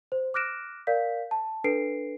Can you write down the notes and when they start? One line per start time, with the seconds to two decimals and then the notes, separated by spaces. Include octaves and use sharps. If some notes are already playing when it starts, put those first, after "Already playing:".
0.12 C5
0.34 D6 F6 F#6 A#6 D7 E7
0.87 A#4 D5 F5 G6 B6
1.31 A5
1.64 D4 A4 B4 C7 D7